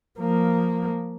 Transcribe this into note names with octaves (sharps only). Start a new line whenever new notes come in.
F3 A#3